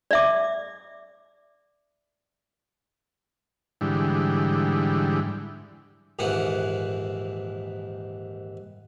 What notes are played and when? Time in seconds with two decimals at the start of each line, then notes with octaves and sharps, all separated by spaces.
0.11 D5 E5 D6
3.81 G#2 D3 E3 G3
6.19 A#1 D#2 G#2 E3 E4 F#5